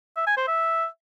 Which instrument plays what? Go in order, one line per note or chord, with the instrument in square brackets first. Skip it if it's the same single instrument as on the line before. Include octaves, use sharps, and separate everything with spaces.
[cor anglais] E5
G#5
C5
E5